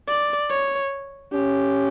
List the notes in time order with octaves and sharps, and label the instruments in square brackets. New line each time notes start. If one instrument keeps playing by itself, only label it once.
[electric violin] D5
C#5
[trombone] C#4 [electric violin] G4